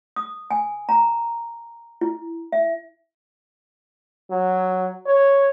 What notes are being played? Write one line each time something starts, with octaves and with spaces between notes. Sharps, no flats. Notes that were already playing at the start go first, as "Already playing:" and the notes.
D#6
G#5
A#5
E4
E5
F#3
C#5